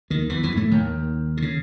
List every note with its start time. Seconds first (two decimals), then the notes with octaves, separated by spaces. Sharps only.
0.10 D#2 D#3
0.29 E2 E3
0.43 E2 E3
0.57 A2 A3
0.71 D#2 D#3
1.37 C3
1.42 C#3